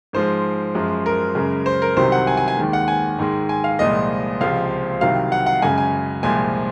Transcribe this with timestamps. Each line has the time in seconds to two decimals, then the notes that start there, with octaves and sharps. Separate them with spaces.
0.13 G#2 F3 G#3 C5
0.75 F#2 F3 G#3
1.06 A#4
1.35 F#2 C#3 G#3
1.66 C5
1.82 A#4
1.96 C2 C3 D#3 F#3 C5
2.12 F#5
2.27 G#5
2.37 G#5
2.48 G#5
2.58 D#2 D#3 G#3
2.73 F#5
2.88 G#5
3.18 G#2 D#3 G#3
3.49 G#5
3.64 F5
3.79 C2 A#2 F3 G#3 D#5
4.40 C#2 C3 F3 G#3 F5
5.01 C2 C3 D#3 F#3 F5
5.32 F#5
5.46 F#5
5.62 F#2 C#3 G#3 G#5
5.78 G#5
6.23 C2 A#2 F3 G#3 G#5